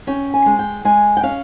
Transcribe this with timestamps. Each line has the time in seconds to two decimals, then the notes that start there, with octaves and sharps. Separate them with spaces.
0.07 C#4 G5
0.34 G#5
0.46 G#3
0.59 G5
0.85 G#3 G#5
1.17 G5
1.23 C#4 F5